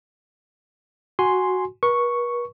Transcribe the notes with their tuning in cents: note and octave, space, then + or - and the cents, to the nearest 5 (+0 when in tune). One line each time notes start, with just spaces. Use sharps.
F#4 +0 G#5 +0 C6 +0
B4 -45 C#6 +0